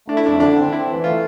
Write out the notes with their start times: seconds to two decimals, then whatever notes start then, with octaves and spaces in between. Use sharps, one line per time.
0.08 A3 D4
0.17 E4
0.24 F2 D4
0.40 D3 D4
0.56 C4
0.72 C4 E4
0.88 E3
1.04 A3 F4